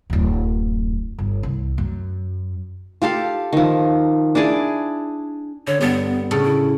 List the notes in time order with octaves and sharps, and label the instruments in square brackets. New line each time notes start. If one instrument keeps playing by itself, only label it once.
[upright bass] D1 F#2
G1
C2
F#2
[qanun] F4 G4 A4 F5
D#3 F3
D4 E4 G#4 D5
[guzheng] D3 [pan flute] C#5
[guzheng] G2 G3 [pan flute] B3
[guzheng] A2 C#3 A4
[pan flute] E4